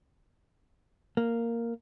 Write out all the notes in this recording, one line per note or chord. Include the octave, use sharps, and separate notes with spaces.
A#3